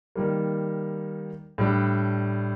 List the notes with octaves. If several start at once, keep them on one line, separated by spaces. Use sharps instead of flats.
D#3 G3 A#3
A2 G3 D4